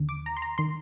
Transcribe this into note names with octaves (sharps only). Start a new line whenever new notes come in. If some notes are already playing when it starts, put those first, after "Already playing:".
Already playing: D#2 D3
D6
A#5
C6
A#5
D#3 C6